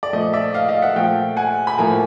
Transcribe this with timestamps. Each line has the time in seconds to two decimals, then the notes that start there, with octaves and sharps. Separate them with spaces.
0.03 D5
0.13 A#2 F3 A3 D#5
0.33 D5 E5
0.54 D#5 F5
0.68 D#5 F5
0.82 E5 F#5
0.95 A#2 F3 A3 F5 G5
1.37 F#5 G#5
1.67 B5
1.78 A2 F3 A#3 G#5 A#5